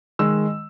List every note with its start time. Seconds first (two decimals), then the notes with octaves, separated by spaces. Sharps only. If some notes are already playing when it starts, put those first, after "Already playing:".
0.19 D#3 G#3 E6